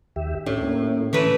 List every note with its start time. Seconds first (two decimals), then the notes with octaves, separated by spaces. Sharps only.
0.16 D#2 G4 E5
0.46 A2 C#4 D4 G4
0.63 A#3 C#4 E4
1.13 D3 E3 A3 C#4 B4